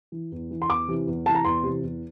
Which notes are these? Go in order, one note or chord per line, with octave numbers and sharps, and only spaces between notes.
E3
E2
E3
C6
E2 D6
C3 E3
E2
C3 E3 A5
A#5
E2 C6
C3 E3
E2